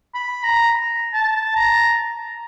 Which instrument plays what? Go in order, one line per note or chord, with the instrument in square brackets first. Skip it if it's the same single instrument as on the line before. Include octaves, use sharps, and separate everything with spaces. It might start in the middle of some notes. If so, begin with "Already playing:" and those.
[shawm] B5
A#5
A5
A#5